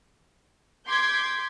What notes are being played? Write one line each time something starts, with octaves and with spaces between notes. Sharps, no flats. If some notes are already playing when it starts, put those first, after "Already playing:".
C6 D6 G6 G#6 B6